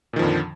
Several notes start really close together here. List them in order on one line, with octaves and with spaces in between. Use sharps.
A#2 D#3 F3 F2 D3